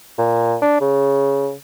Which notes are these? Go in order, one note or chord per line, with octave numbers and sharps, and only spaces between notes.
A#2
D4
C#3